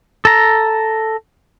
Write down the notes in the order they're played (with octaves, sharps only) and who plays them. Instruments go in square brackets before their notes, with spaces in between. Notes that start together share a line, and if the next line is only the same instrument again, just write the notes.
[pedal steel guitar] A4 A#5